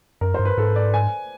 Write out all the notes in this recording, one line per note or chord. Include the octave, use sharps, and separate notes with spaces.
F#2 A#4
G2 C5
B4
G#2 A4
D5
G#5